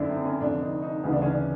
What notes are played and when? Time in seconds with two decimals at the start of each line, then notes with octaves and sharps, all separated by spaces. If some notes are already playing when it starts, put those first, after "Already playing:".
Already playing: F#1 F#2 D3 D4 E4
0.09 C4
0.25 C#4
0.40 F1 F2 D3 D4
0.61 D#4
0.82 D#4
1.03 D2 C#3 E3 D#4
1.12 D4
1.22 C#4
1.31 D4